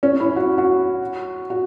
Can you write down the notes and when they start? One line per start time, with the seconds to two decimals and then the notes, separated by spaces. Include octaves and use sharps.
0.03 C#4
0.20 E4
0.36 F#4
0.58 F#4
1.50 F#4